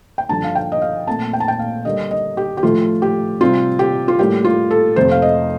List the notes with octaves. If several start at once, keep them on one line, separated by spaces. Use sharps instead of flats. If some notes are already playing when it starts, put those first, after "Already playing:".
G5
G2 D3 F3 A5
F5
G5
D#5
F5
A#2 A3 C4 A5
G5
A5
G5
F5
D3 G3 A#3 D#5
D#5
G4
G4
A2 F3 A3 F4
G4
C3 G3 C4 F4
G4
F4
A2 G3 A#3 G4
F4
A4
F2 C3 F3 A3 C5
F5
D#5